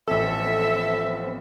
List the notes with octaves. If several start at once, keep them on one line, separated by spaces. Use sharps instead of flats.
A1 F3 B3 C4 A4 E5 E6